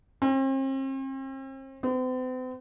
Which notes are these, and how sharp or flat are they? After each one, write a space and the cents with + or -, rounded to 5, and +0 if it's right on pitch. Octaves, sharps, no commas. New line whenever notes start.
C4 +40
C4 -45